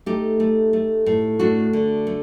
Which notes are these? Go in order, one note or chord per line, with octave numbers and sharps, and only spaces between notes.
A3 D#4 G4
A3
A3
A2
A3 D4 F#4
D3
A3